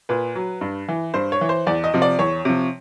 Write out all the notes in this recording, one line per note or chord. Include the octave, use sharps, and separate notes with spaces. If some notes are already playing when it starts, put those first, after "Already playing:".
A#2 B4
F#3
G2
E3
G2 C5
C#5
E3
C5
E2 D5
D#5
C3 F3
D5
E2 C#5
C3 F3